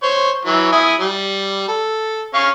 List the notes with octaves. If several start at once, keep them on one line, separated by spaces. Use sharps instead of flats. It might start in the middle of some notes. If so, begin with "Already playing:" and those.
C5 C#5
E3 F#3
E4 G#5 D#6
G3
A4
C#4 F5 C#6